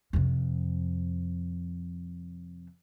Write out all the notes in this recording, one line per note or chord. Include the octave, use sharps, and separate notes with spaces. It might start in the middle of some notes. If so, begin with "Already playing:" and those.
F2 C3